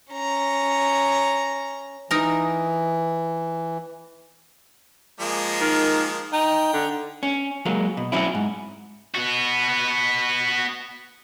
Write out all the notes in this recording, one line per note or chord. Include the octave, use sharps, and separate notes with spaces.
C#4 A#5
E3 D#4 A#4
F3 G#3 A#3
D#3
D#4 G5
D3
C#4
F#3 G#3 A#3
B2
F#3 C4 C#4 E4
G#2
B3 F#4